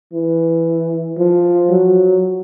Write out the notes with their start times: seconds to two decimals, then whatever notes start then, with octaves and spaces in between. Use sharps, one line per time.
0.13 E3
1.18 F3
1.70 F#3